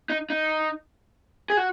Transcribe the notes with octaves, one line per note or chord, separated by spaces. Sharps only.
D#4
D#4
G#4
F#4